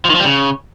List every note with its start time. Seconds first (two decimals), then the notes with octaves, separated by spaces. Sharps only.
0.05 F3
0.10 D#3
0.15 F3
0.20 G3
0.25 C#3